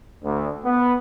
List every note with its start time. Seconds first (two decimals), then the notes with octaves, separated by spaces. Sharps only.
0.24 D2
0.65 B3